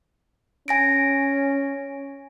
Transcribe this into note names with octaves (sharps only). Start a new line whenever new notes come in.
C#4 G#5 A#6 D7